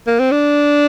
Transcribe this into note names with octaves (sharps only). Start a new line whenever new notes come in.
A#3
C4
D4